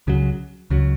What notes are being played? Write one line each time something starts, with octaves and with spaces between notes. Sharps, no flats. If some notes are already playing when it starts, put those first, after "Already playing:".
C#2 C#3 F#3
C#2 C#3 F#3